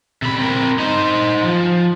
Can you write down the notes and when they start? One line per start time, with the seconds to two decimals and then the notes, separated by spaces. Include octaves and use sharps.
0.22 C3 B5
0.38 C4 A#4
0.79 D#4 C5
1.43 F3